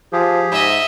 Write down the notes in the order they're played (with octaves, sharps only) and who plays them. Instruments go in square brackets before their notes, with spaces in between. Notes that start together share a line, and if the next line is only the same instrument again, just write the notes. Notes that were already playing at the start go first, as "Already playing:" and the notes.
[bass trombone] F3 [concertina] G4 G#4
[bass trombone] G#2 [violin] D#5 E5